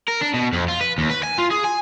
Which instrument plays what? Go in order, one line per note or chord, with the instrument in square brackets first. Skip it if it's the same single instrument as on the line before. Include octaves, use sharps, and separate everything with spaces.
[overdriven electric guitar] A#4
D4
B2
F2
F4
B4
D#2
B4
G#5
F4
G#4
G#5